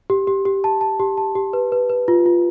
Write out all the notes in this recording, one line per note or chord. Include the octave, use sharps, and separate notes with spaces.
G4
G4
G4
A5
A5
G4
A5
G4
B4
B4
B4
F4
F4